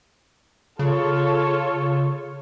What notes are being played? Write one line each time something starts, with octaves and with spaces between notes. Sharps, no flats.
C#3 F4 A4 C#5